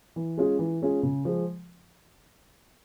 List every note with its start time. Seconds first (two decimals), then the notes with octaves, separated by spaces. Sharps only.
0.16 E3
0.37 G#3 C#4 F4 G#4
0.59 E3
0.82 G#3 C#4 F4 G#4
1.03 C#3
1.25 F3 G#3